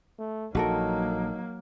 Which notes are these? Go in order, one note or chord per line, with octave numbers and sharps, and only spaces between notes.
A3
A#1 F#3 A#3 D#4 F#4 A4 A#4